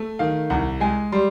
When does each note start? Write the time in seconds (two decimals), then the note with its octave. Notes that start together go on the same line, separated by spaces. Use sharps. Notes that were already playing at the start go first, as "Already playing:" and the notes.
Already playing: A3
0.19 D#3 F5
0.50 C2 F#5
0.80 G#3 G#5
1.12 G3 C6